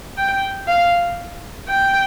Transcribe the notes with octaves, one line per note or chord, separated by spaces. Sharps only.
G5
F5
G5